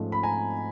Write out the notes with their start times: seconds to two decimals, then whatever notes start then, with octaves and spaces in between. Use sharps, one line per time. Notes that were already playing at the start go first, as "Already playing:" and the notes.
Already playing: G#2 F3 A3 C#4
0.12 B5
0.23 G#5 A#5